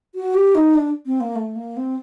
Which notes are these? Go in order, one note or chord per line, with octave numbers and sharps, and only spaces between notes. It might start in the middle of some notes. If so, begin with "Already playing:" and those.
F#4
G4
D#4
D4
C4
A#3
A3
A#3
C4